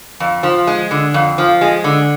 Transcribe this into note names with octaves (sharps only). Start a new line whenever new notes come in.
F2
F3
G#3
D3
F2
F3
G#3
D3